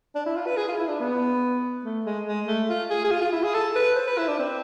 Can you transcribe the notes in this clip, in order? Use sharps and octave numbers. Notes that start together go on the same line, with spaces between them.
D4
E4
F4
B4
G#4
F4
E4
D4
B3
A3
G#3
G#3
A3
F4
G#4
G#4
F4
F4
E4
G#4
A4
B4
C5
B4
E4
D4
C4